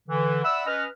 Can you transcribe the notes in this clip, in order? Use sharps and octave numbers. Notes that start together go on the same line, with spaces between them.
D3 E3
D5 E5 F#5 B5 E6
C#4 B4 D#5 F6